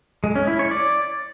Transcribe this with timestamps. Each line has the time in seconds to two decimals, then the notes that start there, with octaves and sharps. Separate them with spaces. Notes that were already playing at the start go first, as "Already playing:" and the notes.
0.24 G#3
0.36 C#4
0.47 E4
0.59 C#5
0.71 D5